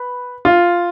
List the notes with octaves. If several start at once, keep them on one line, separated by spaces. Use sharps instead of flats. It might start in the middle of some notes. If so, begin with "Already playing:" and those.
Already playing: B4
F4